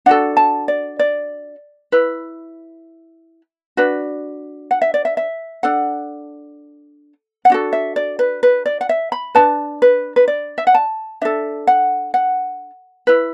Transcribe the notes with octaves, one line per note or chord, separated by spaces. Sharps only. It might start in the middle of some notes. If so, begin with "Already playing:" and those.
D4 F#4 A4 F#5
A5
D5
D5
E4 B4
D4 F#4 B4
F#5
E5
D5
E5
E5
D4 A4 F#5
F#5
D4 F#4 A4
E5
D5
B4
B4
D5
F#5
E5
B5
D4 B4 A5
B4
B4
D5
E5
F#5
A5
D4 A4 E5
F#5
F#5
E4 B4